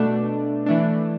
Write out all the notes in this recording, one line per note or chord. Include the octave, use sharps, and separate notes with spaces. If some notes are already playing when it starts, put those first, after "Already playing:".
Already playing: B2 A3 D4
E3 A3 D4